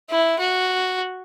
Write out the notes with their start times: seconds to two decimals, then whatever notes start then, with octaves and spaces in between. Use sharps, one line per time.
0.10 E4
0.39 F#4